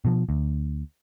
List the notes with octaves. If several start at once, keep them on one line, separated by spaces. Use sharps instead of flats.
B2 F3
D2